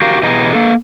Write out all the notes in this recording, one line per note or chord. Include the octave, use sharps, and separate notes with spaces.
F#4 G4 A#4 F5
B2 E3 G4 G#4 D#5 A#5
A#3 A4